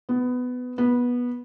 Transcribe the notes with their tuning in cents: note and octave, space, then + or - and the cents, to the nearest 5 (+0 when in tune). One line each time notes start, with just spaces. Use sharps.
B3 +15
B3 -15